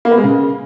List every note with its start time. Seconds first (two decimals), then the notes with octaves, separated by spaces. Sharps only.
0.05 A#3
0.11 B3
0.17 G#3
0.24 C#3